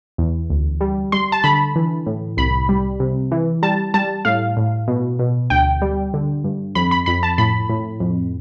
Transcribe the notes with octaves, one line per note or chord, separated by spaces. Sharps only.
E2
D2
G3
G3 C6
A5
D3 B5
E3
A2
C2 B5
G3
C3
E3
G3 A5
G3 A5
A2 F5
A2
B2
B2
D2 G5
G3
D3
G2
F2 B5
B5
F2 B5
A5
A2 B5
A2
F2